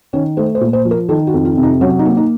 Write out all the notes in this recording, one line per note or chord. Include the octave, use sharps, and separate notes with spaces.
D#3 C#4
A3 C5
C5
A#2
C5
F3
A#4
D#3 A4
F#4
F2
F4
C3
D#4
F#3 C#4
D#4
A#3
D#4